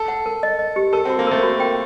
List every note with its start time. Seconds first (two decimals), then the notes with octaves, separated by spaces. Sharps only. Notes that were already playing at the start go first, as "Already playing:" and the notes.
Already playing: A4
0.08 F#5
0.26 A#4
0.43 D#5
0.59 D#5
0.76 G4
0.93 A4 A#4
1.05 C4
1.10 F#4
1.19 A#3
1.27 A3 A#4
1.43 F#4
1.60 G5